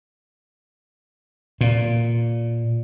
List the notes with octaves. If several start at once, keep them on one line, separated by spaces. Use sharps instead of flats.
A#2